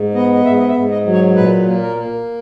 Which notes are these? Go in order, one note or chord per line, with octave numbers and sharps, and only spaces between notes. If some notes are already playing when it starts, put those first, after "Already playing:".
Already playing: G#2
B3 D#5
D#5
G#2 E5
D#5
E5
G#2
D#5
F#3
C#5
A#2 B4
A#3
A#4
A#3